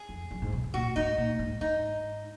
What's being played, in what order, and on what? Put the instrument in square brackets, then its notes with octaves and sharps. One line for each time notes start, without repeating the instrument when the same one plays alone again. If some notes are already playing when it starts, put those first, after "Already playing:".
Already playing: [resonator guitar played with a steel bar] G#4
[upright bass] F2
F#2
G#2
B2
D3
[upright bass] A#2 [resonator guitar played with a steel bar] F#4
[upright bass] G#2 [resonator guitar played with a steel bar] D#4
[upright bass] A#2
G#2
[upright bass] G#2 [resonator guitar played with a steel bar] D#4